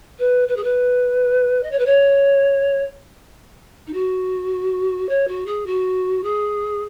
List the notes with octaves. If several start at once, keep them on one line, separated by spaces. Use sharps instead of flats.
B4
B4
G#4
B4
D#5
C#5
B4
C#5
D#4
F#4
C#5
F#4
G#4
F#4
G#4